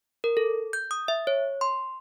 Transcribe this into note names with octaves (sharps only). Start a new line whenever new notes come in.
A#4
A4
G6
D#6
E5
C#5
C6